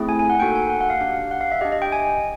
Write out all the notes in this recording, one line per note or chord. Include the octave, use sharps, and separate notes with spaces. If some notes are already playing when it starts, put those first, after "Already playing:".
Already playing: A3 C4 E4 G#4
G#5
G#5
F#5
A#3 D#4 F#4 A4 G5
G#5
F#5
F#5
F5
D4 G4 F5
F#5
F5
E5
D4 G4 D#5
D#5
G5
G#5